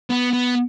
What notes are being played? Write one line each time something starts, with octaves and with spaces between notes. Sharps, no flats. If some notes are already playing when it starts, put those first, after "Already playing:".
B3
B3